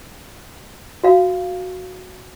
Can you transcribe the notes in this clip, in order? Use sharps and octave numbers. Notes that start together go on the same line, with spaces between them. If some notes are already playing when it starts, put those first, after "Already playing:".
F#4 F5